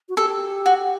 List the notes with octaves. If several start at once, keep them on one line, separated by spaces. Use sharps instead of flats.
F#4
G4 A4
F#4